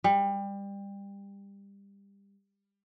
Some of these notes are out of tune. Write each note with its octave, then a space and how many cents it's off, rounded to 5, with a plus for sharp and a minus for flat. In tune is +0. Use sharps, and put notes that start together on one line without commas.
G3 +25